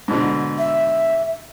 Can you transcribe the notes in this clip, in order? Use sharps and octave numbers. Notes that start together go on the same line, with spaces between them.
G#2 B2 D3
E5